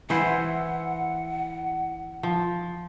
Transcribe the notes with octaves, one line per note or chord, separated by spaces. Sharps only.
E3 E4 C5 F#5
F3